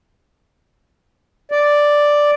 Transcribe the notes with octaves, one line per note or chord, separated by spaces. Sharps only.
D5